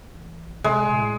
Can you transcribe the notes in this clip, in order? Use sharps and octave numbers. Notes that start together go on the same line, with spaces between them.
A1
C3 G#3
A2